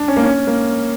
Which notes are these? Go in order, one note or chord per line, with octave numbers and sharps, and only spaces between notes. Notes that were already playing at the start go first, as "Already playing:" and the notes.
Already playing: D4
C#4
A#3
C#4
A#3